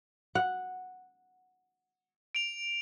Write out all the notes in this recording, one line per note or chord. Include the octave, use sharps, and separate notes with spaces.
F#5
D7 F7